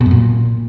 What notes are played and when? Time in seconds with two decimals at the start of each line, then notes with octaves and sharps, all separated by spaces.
0.01 B2
0.06 F#2
0.11 A#2